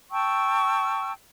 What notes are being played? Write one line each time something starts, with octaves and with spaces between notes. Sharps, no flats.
G5 A5 C#6 E6